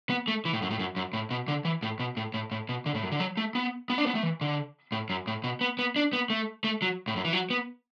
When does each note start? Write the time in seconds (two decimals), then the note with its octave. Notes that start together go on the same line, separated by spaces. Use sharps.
0.10 B3
0.28 A3
0.45 E3
0.53 A2
0.62 F#2
0.70 A2
0.79 F#2
0.96 F#2
1.13 A2
1.30 B2
1.48 D3
1.65 E3
1.83 A2
1.99 B2
2.17 A2
2.34 A2
2.52 A2
2.69 B2
2.86 D3
2.95 A2
3.03 F#2
3.12 D3
3.20 F#3
3.37 A3
3.55 B3
3.90 B3
3.98 D4
4.06 B3
4.15 A3
4.23 E3
4.41 D3
4.92 A2
5.10 F#2
5.27 A2
5.44 B2
5.61 B3
5.79 B3
5.96 D4
6.13 B3
6.30 A3
6.64 A3
6.82 F#3
7.08 A2
7.16 F#2
7.25 E3
7.33 F#3
7.50 B3